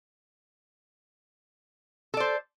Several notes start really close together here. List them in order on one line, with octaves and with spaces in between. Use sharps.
A4 D5 C5